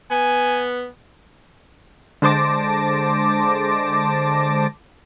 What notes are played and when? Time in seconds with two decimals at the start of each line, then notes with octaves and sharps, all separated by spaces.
0.10 B3 G#5
2.22 D3 G#3 C5 A5 D6 A#6